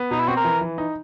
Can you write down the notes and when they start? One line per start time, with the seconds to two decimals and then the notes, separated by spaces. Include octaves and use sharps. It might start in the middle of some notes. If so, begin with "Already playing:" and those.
Already playing: B3
0.11 B2 D#4
0.20 E4
0.28 C4 F#4
0.36 A#4
0.44 E3
0.61 E3
0.78 D#4